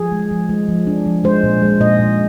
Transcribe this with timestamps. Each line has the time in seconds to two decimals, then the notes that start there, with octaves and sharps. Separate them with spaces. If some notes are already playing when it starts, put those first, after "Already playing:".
Already playing: F3 G#4
0.12 G#3
0.31 F3
0.49 G#3
0.68 F3
0.87 D4
1.06 F3
1.24 G#3 C5
1.43 A#2
1.62 G#3
1.80 A#2 D#5
1.99 A#2